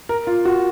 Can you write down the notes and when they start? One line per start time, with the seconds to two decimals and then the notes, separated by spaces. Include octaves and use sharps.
0.09 A#4
0.27 F4
0.45 F#4